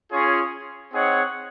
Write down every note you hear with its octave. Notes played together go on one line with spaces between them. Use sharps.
C#4 F4 G#4 C#5
C4 D#4 G#4 C#5 F#5